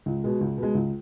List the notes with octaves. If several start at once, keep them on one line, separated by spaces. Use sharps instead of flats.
C#2
B2 G#3
C#2
B2 G#3
C#2